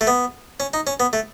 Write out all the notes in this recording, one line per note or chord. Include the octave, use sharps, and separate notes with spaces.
A3
B3
C#4
D#4
C#4
B3
A3